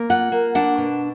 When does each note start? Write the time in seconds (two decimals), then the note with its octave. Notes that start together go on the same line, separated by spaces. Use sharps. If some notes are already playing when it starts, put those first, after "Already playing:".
Already playing: A#3
0.10 F4 F#5
0.32 A#3
0.55 D4 F#5
0.78 B2